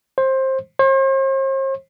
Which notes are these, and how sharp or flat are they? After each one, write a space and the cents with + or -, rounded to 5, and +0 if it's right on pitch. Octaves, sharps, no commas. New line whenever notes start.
C5 +20
C5 +45